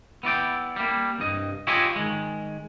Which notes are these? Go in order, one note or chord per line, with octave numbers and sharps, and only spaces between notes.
B3 E4 D5 G5
G3 A#3
C2 G2 D#5
E4 F4 G4 G#4 C#5 D#5
D#3 G#3